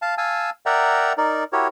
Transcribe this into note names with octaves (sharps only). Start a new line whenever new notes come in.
F5 A5
F5 G#5 A5 E6
A#4 D5 E5 F#5 G5 A#5
D#4 A#4 D5
E4 F#4 G4 A#4 C#5